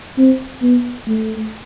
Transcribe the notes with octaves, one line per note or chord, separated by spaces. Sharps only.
C4
B3
A3